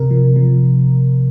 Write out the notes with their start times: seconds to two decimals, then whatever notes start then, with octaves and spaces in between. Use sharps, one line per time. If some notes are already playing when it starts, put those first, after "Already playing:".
Already playing: C3 A#4
0.11 F3
0.36 F3